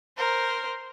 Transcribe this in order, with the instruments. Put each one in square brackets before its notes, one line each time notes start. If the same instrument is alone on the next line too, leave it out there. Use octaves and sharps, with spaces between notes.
[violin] A#4 C5